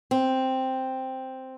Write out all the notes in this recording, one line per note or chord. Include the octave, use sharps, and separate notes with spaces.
C4